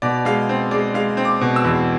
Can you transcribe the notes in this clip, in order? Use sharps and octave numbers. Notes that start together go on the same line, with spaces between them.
B2 D5
G#3 F5
C4
G#3 D5
G#3 F5
C4
D6
B2
E6
E2